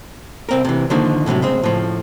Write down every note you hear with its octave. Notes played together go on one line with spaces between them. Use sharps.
C2 C4 A#4
C3 E3
D3 D#3 F3 A#3
A2 C3 E3 F#3
C#3 G#3 C4
A2 F3